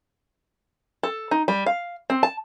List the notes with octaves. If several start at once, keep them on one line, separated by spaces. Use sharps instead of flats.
A4
D#4
G3
F5
C4
A5